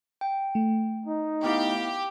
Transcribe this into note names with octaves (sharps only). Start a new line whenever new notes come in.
G5
A3
D#4
B3 E4 G4 F5